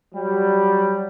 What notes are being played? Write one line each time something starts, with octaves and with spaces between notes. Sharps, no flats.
F#3 G3